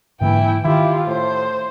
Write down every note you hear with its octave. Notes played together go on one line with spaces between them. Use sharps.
G#2 D3 E3 A#3 E4 G5
D#3 E4 F4 G4
A2 C5